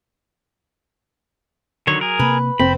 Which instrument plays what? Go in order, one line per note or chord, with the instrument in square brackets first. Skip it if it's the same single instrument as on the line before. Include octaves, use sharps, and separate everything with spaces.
[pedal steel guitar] D3 D#3 C#5 [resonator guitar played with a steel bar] F#3
[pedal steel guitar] G#4 A#4
[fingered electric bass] C3 A#3 [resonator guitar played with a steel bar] B4
[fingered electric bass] F1 [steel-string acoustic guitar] C4 [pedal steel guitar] B5